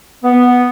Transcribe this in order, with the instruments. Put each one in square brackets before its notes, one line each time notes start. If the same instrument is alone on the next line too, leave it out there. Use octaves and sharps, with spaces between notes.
[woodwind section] B3